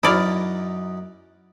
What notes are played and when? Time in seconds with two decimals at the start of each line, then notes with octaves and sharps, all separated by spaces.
0.03 F#2 D#4 E4 D5 D#5 F5